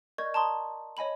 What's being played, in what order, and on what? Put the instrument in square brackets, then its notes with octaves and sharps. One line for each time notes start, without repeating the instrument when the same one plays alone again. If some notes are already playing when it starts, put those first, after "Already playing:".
[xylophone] A#4 D5 D#5 C#6 G6 G#6
A5 A#5 C6 D#6
C#5 D#5 G#5 B5 F#7